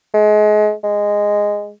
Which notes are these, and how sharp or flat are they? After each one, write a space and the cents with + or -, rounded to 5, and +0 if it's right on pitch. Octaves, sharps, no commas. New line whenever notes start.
G#3 +30
G#3 -10